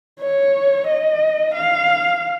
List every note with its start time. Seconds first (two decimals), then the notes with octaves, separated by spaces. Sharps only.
0.20 C#5
0.87 D#5
1.55 F5